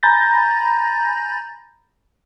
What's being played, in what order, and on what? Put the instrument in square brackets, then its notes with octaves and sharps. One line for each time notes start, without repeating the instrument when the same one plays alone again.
[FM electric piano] G#5 A#5 B5 G6 A6 A#6